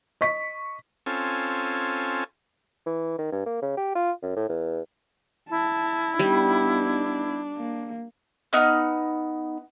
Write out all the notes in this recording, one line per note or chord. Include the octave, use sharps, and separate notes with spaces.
D#5 C#6 B6
C4 C#4 F4 A4 G#5
E3
D#3
G2
A#3
C#3
G4
F4
F#2
A2
E2
E4 A5
G3 B3 D4 D#4
A#3
B3 D#4 F6